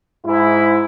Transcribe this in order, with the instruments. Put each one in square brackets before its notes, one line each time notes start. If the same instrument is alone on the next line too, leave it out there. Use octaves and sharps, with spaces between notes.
[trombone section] G#2 E4